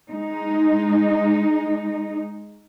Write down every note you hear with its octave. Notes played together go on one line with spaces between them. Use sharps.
G#3 D#4